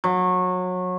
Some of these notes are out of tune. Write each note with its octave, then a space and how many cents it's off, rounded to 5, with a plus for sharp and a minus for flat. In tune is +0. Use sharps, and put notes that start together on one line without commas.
F#3 -25